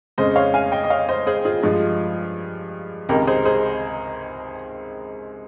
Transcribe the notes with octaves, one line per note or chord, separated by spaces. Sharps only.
F2 C#3 G#3 C5 D#5
C#5 F5
F5 G#5
D#5 G5
D#5
C#5 F5
C5 D#5
G#4 C5
F4 G#4
G2 F3 G#3 F4 G#4
C#2 C3 D#3 G#3 G4 A#4
G#4 C5
G#4 C5